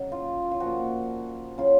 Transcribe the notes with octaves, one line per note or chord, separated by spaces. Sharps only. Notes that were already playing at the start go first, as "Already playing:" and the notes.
Already playing: C#3 F#3 D#4
F4
F4
A#2 F3 F#4
C#3 F#3 F4